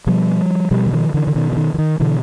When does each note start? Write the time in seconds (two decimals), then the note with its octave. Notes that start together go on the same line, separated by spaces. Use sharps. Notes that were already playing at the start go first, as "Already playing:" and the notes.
0.07 B2 F3 G3
0.71 B2 F3 G3
0.87 E3
0.93 D#3 F3
1.14 D3 E3
1.27 D3
1.35 B2 D#3
1.52 E3
1.57 D#3
1.74 E3
1.78 D#3
2.00 B2 D3 E3